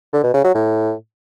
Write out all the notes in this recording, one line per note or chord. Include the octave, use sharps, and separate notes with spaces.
D3
B2
C#3
F#3
A2